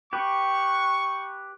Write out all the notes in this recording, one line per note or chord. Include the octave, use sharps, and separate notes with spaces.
G4 B4 C#6